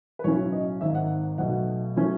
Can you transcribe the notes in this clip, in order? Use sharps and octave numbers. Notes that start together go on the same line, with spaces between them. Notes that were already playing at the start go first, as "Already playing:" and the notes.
B4
B1 A2 F#3 C#4 C#5
D#5
G#1 G#2 D#3 E5
F#5
B1 B2 F#3 A3 F#5
F#3 A3 C#4